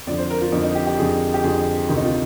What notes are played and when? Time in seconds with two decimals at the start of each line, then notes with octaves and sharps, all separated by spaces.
0.07 F2 D3 F3 D5
0.18 C5
0.30 A#4
0.41 F4
0.52 F2 D3 F3 D#4
0.64 D#4
0.75 G4
0.87 G4
0.98 F2 D3 F3 G#4
1.34 G4
1.44 F2 D3 F3 G#4
1.88 D2 C3 D#3
1.97 D#4
2.04 F4